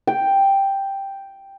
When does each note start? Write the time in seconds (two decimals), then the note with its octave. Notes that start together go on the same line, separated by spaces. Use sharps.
0.07 G5